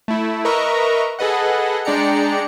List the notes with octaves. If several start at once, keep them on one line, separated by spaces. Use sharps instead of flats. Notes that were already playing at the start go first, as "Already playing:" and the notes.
A3 E4
A#4 B4 D#5 E5 A#5 C#6
G#4 A4 B4 D#5 F#5
G#3 D4 D5 G5 A#5 C#7